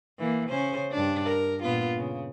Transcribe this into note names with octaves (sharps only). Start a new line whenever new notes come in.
E3 A#3
C#3 C#4 C5
G2 D4
A#4
A#2 B3 F4
C#3